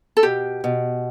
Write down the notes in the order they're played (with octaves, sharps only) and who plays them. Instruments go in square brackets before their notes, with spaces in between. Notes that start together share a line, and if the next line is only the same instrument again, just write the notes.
[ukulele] A4
[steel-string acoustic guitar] B2 [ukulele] G4
[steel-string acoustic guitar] B2